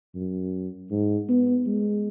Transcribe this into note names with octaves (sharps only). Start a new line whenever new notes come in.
F#2
G#2
B3
G#3